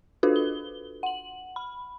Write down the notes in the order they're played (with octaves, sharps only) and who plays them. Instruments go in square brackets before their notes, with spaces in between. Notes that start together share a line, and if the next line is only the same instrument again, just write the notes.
[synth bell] D4 F4 F#4 A4 B4
G7
F#5 F#7
B5